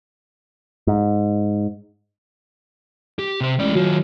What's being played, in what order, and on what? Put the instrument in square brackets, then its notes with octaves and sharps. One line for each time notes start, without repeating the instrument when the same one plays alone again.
[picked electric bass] G#2
[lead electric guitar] G4
C3 C5
[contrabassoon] A1 [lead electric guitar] G#3 D5
[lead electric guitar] D#3 F4 [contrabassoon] F#3